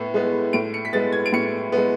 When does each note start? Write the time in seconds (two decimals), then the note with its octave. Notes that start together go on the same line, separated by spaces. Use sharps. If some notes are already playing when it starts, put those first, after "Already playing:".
Already playing: A2 B3
0.14 G#3 B3
0.53 A2 D7
0.74 C#7
0.85 B6
0.93 G#3 B3 A6
1.12 G#6
1.26 D7
1.32 A2 C#7
1.72 B3
1.77 G#3